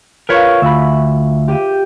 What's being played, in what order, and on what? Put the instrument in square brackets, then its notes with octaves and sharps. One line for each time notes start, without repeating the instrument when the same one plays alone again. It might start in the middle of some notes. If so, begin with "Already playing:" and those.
[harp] F4 C#6 [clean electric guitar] A#4 B4 C#5
[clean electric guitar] D2 B5 [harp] E5
[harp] G4 G5 D#7